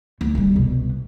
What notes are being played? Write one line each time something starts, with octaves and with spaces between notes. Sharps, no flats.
D2 F#3
D#1 G3
C2 B2